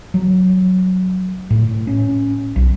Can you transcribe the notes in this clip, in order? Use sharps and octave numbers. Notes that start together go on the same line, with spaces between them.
F#3
A2
C#4
B1